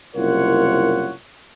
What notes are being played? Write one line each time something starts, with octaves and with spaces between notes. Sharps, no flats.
F#1 C2 F4 A#4 C#5 F#5